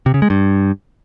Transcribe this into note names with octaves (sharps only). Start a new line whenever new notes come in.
C3
C#3
G#3
G2